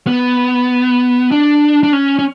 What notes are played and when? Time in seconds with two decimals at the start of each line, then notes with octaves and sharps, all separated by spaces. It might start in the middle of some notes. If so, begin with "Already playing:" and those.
0.07 B3
1.31 D4
1.83 D4
1.93 C#4
2.19 C#4